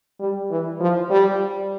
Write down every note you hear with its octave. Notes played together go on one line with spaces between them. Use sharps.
G3
E3
F3
G3